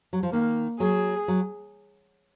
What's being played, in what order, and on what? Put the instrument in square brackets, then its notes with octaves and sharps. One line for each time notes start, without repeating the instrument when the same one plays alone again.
[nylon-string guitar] F#3
F3
[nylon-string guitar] D#3 [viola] A#3
[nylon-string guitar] F#3 [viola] G#4
[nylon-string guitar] F#3